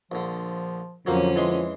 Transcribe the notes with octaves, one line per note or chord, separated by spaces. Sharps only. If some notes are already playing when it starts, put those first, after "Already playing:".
A#1 D3 F3
F2 D3 F3 F#3 A#3 C#4 C5
E3 G#3 C6